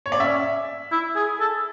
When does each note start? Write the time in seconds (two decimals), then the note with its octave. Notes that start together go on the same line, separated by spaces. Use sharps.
0.06 C#5
0.12 D5
0.20 C#4 E5
0.92 E4
1.16 G#4
1.40 A4